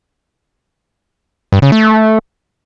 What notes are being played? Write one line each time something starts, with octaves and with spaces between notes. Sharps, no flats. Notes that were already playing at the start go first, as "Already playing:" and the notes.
G2
C#3
A3